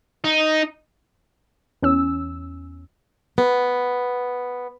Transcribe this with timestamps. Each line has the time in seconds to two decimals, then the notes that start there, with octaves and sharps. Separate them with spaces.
0.24 D#4
1.82 E2 C#4 E6
3.38 B3